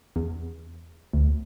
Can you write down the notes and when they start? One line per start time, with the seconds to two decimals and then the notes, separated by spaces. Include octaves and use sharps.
0.16 E2
1.13 D2